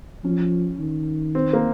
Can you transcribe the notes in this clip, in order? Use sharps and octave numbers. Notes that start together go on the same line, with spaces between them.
F3 C#4
D#3
C4
A#3